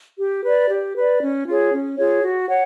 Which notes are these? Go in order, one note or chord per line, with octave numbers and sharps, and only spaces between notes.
G4
B4 D5
G4
B4 D5
C#4
F4 G#4 C#5
C#4
F4 G#4 C#5
F#4
C#5 F#5